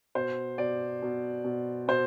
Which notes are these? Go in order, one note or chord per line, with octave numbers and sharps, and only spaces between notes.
B2 C5
B2 D5
B2
B2
B2 C5